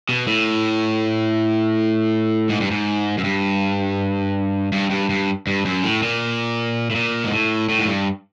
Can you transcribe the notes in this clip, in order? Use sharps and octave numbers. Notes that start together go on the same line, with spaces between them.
B2
A2
G#2
G2
G#2
F#2
G2
G2
G2
G2
G2
F#2
A2
A#2
A2
A#2
G#2
A2
A2
G#2
G2